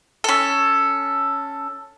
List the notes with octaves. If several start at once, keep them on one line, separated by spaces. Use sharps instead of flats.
C#4 A4